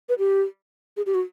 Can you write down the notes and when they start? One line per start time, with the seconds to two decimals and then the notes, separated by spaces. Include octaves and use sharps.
0.09 B4
0.18 G4
0.97 G#4
1.06 G4
1.15 F#4